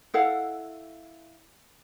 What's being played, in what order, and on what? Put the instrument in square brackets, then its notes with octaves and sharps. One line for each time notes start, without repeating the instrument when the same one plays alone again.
[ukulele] E4 A4 F5 F#5